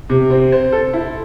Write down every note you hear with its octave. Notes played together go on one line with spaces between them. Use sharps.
C3
C4
C5
A4
E4